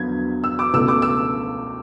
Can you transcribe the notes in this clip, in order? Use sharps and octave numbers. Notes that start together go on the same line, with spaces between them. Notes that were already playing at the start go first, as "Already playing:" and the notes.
Already playing: E2 D3 F#3 B3 G#6
E6
D6
C#2 B2 A3 E6
D6
E6